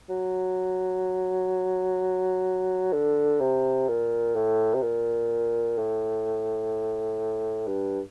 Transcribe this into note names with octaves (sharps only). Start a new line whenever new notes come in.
F#3
D3
C3
A#2
A2
C3
A#2
A2
G2